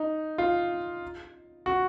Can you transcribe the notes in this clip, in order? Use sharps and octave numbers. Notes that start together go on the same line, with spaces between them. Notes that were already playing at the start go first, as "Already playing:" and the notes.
Already playing: D#4
F4
F#4